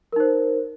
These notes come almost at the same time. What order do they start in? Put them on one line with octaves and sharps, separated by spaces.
A#4 D#4 C5